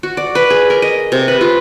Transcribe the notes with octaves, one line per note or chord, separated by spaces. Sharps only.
F#4
D5
B4
G#4
A#4
D#5
C3
B4
F4